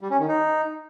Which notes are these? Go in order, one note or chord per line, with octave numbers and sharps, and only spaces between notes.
G3
C#4
D#3
D#4